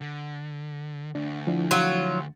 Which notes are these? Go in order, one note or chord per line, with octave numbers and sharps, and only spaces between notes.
D3
D2 D4
F3 D4 E4
F#3 F4